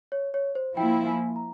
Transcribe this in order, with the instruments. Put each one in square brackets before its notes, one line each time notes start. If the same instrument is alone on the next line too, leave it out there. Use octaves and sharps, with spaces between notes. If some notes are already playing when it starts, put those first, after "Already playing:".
[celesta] C#5
C#5
C5
[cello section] F3 A#3 E4 [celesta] G5
[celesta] G#5
A#5